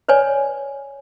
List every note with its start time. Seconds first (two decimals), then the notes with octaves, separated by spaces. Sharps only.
0.08 B4 C#5 D5 G#5